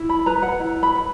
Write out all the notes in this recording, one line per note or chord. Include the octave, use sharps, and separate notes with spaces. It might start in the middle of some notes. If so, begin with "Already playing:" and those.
Already playing: E4
B5
B4 A#5
F#5
E4
B5
B4